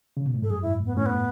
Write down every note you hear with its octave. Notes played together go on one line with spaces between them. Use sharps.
C#3
B2
A2
G#2 A4
F#2 G#4
G#2 E4
A2 B3
A2 C#4
B3